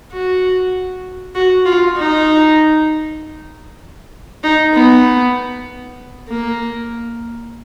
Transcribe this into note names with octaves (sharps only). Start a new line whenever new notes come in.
F#4
F#4
F4
D#4
D#4
B3
A#3